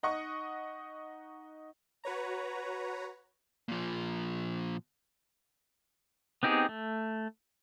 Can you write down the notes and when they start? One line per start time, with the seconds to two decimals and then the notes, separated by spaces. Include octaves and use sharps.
0.03 D#4 D#5 F#5 C#6
2.04 F#4 B4 C#5 A#5
3.68 A#2 F3
6.43 B3 C4 D#4 G4 G#4
6.69 A3